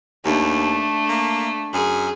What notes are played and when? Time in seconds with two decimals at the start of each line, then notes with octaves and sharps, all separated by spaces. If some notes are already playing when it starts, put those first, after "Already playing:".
0.25 D#2 A3 D4
1.09 A#3
1.73 F#2 G#4